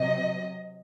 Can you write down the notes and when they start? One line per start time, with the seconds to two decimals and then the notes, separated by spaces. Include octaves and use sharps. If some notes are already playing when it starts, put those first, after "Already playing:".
Already playing: C3 F#3 D#5